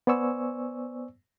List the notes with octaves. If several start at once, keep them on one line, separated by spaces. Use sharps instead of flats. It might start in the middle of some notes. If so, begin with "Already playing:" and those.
B3 C5 D5 G#5 C#6 E6